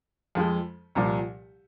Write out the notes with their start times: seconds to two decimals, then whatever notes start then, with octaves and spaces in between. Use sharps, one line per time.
0.35 F2 F3 G#3
0.95 C2 A#2 F3